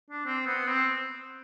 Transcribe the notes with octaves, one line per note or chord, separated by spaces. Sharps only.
D4
C4
B3
C4